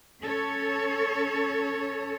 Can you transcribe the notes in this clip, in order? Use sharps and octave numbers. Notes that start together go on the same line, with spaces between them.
C#4 A4 C#5